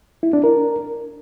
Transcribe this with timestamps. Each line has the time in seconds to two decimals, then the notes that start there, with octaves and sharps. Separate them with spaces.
0.23 E4
0.33 D4
0.44 A#4